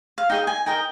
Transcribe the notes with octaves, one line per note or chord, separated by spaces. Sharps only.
F5
D#4 G#4 D#5 G5
G#5
D#4 A#4 D#5 G5